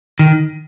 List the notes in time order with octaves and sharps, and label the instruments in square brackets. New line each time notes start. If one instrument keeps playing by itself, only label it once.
[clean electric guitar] D#3